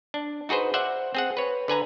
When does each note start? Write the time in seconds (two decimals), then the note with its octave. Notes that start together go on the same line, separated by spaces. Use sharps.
0.14 D4
0.49 D#4 F#4 G#4 B4 C5
0.74 C5 D5 E5 F#5
1.15 C4 G#4 F#5
1.37 B4 C#5
1.68 D3 B4 G#5 A#5